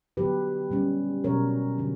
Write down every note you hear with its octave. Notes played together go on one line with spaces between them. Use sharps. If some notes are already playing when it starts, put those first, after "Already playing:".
D3 F#3 B3 G4 B4
A#2 G3 C#4
B2 F#3 C#4 A#4 C#5
D3 F#3